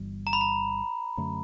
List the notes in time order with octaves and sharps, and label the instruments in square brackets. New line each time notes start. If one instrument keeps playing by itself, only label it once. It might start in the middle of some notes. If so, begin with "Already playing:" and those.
Already playing: [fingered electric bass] G1 G2 E3 G3
[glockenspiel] A#5
B5
A#5
[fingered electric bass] F#2 D3 F#3 A3